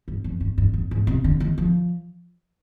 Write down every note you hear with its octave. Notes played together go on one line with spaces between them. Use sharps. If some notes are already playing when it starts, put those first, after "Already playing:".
G2
F2
G2
G2
G2
G#2
C3
D3
D#3
F3